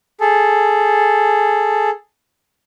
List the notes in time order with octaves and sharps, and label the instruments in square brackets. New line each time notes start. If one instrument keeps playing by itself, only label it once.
[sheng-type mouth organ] G#4 A4